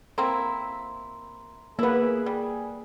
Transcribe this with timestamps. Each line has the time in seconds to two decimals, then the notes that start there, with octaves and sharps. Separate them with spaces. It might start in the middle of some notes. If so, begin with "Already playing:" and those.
0.18 A#3 C4 E4 A#5 C6
1.79 A#3 B3 E4 G#4 B4
2.26 G3